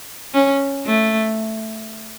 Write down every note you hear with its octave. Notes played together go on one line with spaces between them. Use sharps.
C#4
A3